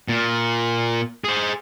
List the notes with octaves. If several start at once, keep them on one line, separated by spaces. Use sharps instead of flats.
A#2
G#4 C5